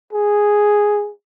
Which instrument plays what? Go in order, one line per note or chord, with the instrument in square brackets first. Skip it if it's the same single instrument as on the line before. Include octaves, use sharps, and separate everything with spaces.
[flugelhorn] G#4